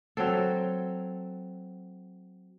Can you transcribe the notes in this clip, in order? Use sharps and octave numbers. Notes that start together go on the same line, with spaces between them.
F#3 C4 A4